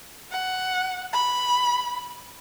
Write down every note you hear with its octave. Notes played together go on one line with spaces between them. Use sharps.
F#5
B5